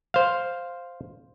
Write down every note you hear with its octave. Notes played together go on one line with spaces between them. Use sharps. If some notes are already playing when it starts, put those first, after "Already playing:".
C5 F5